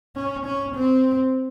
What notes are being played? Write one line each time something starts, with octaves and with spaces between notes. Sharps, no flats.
C#4
C#4
C4